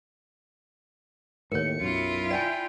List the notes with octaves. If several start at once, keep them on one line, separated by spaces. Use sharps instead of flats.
D#2 A2 A#4 C#5 C#7
B1 F#2 E4 F4
D5 G5 G#5